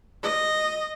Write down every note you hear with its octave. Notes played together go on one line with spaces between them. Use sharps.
D#5